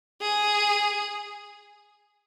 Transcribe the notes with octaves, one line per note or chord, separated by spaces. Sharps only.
G#4